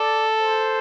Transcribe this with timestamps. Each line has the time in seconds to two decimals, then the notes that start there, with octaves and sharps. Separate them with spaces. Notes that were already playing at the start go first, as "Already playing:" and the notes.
Already playing: A4 D5
0.40 C5